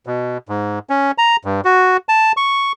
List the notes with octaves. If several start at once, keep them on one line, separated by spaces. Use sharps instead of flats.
B2
G#2
C#4
A#5
G2
F#4
A5
C#6